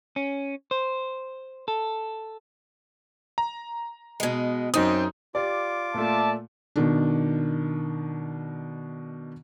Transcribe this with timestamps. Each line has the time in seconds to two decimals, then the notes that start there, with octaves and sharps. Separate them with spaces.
0.16 C#4
0.71 C5
1.68 A4
3.38 A#5
4.20 B2 G#3
4.74 F#2 C4 D#4 D#6
5.35 F4 G4 D5 D6
5.94 A#2 A3 D5 E5 A5
6.76 B2 D#3 D4